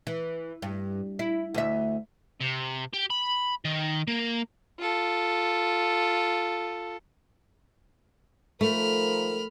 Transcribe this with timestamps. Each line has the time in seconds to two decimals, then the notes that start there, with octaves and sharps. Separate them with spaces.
0.07 E3
0.62 G2
1.19 E4
1.54 D2 E5
2.40 C3
2.93 G4
3.10 B5
3.65 D#3
4.08 A#3
4.79 F4 A4
8.61 D#3 F3 A3 A#4 B5 F6